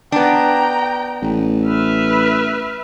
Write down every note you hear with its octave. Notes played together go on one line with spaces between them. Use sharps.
B3 D4 G5 A#5
A1
B4 E5 F6